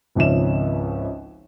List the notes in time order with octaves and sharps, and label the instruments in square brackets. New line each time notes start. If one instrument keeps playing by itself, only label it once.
[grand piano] G#1 C#2 F3 C#4 E5 E7